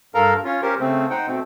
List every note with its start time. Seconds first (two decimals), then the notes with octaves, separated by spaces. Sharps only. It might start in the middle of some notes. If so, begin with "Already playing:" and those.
0.15 G2 A4 A#4 F5 A#5
0.44 C#4 F4
0.62 C#4 G4 A#4 C5
0.80 C#3 A3 C4
1.10 D#4 C5 F#5 G5
1.27 B2 A3 C4